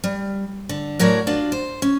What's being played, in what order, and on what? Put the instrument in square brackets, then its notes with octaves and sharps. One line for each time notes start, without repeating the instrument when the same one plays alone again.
[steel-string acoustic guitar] G3
D3
A2 F#3 A#4 C#5 D5
D4 F4 F#4
C5
C#4